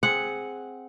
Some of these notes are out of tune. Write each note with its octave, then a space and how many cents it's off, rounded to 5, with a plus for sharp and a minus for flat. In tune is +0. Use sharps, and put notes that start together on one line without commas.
C4 +0 G#4 +0 F#5 -5